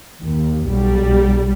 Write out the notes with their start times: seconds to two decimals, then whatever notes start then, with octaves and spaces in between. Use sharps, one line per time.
0.21 D#2
0.68 B1 G3